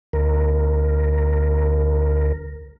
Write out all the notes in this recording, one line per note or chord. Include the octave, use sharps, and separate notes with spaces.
D2 A#4